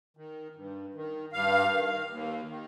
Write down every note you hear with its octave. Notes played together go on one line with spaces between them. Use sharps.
D#3
G2
D#3
G2 F5
D#3
D#2
D#3